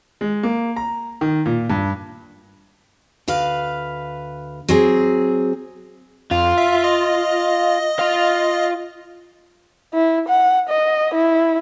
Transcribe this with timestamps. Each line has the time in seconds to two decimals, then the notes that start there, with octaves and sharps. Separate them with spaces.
0.21 G#3
0.43 A#3
0.76 A#5
1.21 D#3
1.46 A#2
1.70 G2
3.28 D2 B4 F5
4.69 F#3 C4 G#4
6.31 F2 F4
6.58 E5
6.84 D#5
7.99 F4 F5
9.93 E4
10.29 F#5
10.69 D#5
11.14 E4